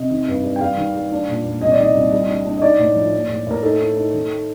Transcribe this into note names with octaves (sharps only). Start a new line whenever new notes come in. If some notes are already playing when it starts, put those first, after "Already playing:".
Already playing: C3 D#5
D#3
G2
G3
G5
G3 F5
D#3
G3
D4
A#2
A#2
C2 D#5
D5
D#3 D#5
C2
G3
D4
D4
D#5
D#4 D5
A2
F3
A#3
A2
A2 A#4
D#4 A4
D#4
D#4
D#3